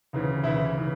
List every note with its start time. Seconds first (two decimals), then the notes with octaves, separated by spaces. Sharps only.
0.13 D2 C#3 E3
0.43 D2 C#3 E3 E4 E5
0.78 C#3 E3